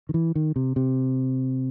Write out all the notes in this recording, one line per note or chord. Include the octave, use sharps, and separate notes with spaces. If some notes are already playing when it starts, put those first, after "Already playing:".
D#3
E3
D#3
C3
C3